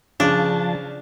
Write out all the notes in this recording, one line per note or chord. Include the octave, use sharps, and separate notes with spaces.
C#3 F3 D4 A5